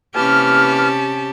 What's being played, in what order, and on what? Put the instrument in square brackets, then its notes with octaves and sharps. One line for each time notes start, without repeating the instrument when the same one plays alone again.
[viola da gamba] C3 C#4 G4 [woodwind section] E3 A#3 F6 [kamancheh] A5